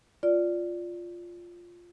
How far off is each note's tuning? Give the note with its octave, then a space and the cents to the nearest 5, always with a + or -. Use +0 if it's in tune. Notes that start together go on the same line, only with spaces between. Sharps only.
F4 +0 D5 +0